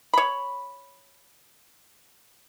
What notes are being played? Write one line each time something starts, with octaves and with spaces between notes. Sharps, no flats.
C#5 B5